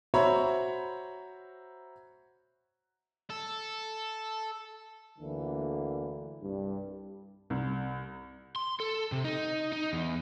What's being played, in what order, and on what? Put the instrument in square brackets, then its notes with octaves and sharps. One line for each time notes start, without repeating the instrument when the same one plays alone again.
[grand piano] F#4 C5 C#5 E5 A#5 B5
[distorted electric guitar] A4
[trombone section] D2 D3 E3 A#3
C2 G2 G3
[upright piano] C2
[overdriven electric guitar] C6
A4
C3
D#4
D#4
E2